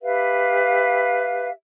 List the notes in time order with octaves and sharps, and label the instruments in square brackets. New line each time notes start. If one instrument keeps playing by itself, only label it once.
[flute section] G4 B4 E5 F5